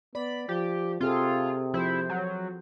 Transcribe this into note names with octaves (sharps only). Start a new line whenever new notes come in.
B3 D5 B5
F3 G4
C3 C4 F4 G#4 A4
F3 E4 C5
F#3